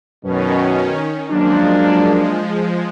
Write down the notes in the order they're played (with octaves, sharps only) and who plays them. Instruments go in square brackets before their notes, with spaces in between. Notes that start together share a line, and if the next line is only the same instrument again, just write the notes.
[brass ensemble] F#2 B2 [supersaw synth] D#3 C#4
[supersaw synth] F3 G#3 [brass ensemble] F#3 A#3 D4